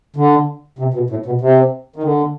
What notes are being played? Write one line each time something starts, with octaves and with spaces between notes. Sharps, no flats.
D3
C3
B2
A2
B2
C3
D#3
D3